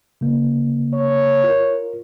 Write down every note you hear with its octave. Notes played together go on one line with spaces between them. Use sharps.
C#3 A#3
C#5
F4 A#4